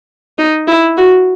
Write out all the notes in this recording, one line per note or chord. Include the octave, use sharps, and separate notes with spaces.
D#4
E4
F#4